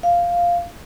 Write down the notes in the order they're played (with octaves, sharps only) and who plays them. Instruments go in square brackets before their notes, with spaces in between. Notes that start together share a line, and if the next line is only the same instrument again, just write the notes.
[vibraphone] F5